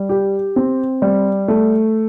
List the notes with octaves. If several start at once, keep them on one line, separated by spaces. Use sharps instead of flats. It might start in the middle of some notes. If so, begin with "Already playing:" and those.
Already playing: G3
G4
C4
G3
A3